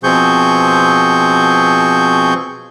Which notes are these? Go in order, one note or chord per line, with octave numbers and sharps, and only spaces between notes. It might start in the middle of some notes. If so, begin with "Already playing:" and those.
B2 F3 C4 G#4 C#6 G6